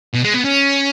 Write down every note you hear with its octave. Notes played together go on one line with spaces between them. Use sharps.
B2
G#3
B3
C#4